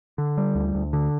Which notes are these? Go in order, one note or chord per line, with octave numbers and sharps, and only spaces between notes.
D3
G3
D2
D2
D3